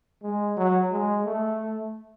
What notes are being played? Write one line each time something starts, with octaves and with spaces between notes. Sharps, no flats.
G#3
F#3
G#3
A3